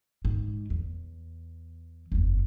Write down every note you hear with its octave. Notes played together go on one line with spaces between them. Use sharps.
G#2
E2
F#1 E2